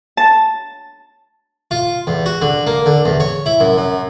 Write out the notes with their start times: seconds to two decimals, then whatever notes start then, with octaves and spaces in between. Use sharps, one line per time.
0.17 A5
1.71 F4
2.07 E2
2.26 F#4
2.42 D3
2.67 A#3
2.86 D3
3.05 E2
3.20 C#5
3.46 E4
3.60 F#2
3.78 F#2